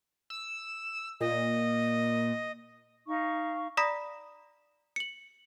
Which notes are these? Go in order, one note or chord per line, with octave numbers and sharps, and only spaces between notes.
E6
A#2 D#5
D#4 F5 C#6
D5 A#5 B5 D#6 A#6 B6
C#7 F#7